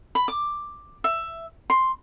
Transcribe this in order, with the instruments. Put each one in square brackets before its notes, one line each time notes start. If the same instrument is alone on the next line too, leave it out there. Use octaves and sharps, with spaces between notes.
[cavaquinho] B5
D6
E5
C6